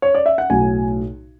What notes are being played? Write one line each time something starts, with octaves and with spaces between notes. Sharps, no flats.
C#5
D5
E5
F#5
B1 A2 F#3 G#5